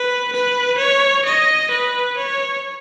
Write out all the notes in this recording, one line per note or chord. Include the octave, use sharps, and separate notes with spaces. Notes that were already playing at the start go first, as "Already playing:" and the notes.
Already playing: B4
B4
C#5
D#5
B4
C#5